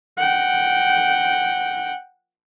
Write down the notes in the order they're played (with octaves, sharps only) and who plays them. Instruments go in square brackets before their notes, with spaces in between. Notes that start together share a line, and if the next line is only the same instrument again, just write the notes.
[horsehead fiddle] F#5 G5